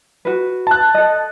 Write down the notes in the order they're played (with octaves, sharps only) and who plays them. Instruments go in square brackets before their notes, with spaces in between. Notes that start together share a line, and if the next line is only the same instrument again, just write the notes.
[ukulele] F#4 B4
[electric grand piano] A5 F#6
[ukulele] A4 D#5